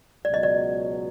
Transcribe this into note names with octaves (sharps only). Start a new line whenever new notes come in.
C#2 B2 F#3 D5
D#5
D5